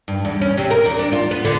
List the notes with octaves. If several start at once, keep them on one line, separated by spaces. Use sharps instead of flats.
G2
E2
C#4
C3
A#4
E2
D4
F4
B3
D3